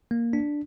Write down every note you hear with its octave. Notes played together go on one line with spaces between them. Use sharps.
A#3
D4